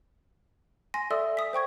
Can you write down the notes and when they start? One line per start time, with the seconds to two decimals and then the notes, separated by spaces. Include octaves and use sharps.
0.94 G#5 C6 A#6
1.10 A4 D5 E5 C6 D#6 E6
1.37 D#6 B6
1.53 C5 G5 C#6 G#6